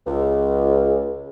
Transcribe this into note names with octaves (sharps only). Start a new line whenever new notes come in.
C#2